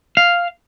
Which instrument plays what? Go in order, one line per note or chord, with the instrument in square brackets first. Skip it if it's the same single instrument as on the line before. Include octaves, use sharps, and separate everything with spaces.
[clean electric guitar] F5